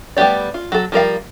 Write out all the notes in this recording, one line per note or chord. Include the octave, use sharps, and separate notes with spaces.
G3 A3 B3 G4 D5
F4
F#3 A4
F3 G3 A#4 F5